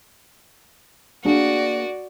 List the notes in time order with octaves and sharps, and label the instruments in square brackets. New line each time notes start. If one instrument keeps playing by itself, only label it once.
[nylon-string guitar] A#3 D4 G#4 [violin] F#4 D5